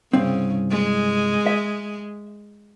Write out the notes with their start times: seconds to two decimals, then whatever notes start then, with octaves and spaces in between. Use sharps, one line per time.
0.13 C2 G2 C#3 C4
0.71 G#3
1.46 E5